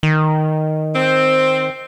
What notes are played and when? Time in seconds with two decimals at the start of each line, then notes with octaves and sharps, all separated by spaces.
0.03 D#3
0.95 C4